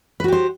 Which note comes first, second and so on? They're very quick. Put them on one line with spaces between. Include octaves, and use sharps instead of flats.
B4 F#4 G4 C5